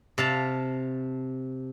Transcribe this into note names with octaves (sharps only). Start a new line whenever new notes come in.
C3 F5 A5